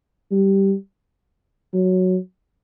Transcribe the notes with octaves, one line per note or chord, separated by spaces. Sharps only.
G3
F#3